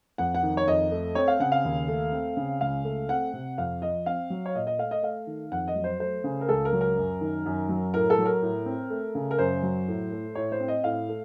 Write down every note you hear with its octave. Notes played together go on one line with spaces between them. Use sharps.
F2 F#5
F#5
D#3
C#5
F2 D#5
A3
C4 C#5
F5
C#3 F#5
F5
D#2
A3
C4
C#3
C#2 F5
A3
C4 F#5
C3
F2 F5
F3 D#5
C4 F5
F#3
C#5
A#2 D#5
D#5
A3 F5
D#5
A3 F5
D#3
F2 F#5
D#5
F#3
C5
A3 C5
C#3
A#4
C#2 A4
A#4
F#3
A#4
F#2
D#3
F#2
F#3
A2 A#4
A4
F#3
A#4
A2
C4
A3
C#3
A#4
F#2 C5
F#3
A2
A3
A2 C#5
C5
C4
D#5
A2 F5
A3